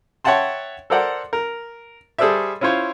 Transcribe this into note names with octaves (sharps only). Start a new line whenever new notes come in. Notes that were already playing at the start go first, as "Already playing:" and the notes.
C#5 E5 F#5 G5 A5 C6
A4 A#4 C5 D5 F#5
A#4
G3 G#4 A4 C5 D5 E5
C#4 E4 F4 C5 C#5